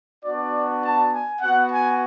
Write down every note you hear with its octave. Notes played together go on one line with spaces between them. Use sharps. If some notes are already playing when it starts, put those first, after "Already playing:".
B3 D4 F#4 D5
A5
G#5
B3 F#4 F#5
G#5